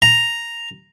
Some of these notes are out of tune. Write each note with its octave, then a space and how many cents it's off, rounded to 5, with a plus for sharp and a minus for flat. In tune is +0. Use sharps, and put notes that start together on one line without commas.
A#5 +0